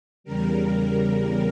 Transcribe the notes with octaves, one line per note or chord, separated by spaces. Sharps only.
E2 C#3 G3 A#4